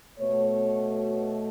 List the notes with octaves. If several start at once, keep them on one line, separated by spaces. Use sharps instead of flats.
B2 A3 C#5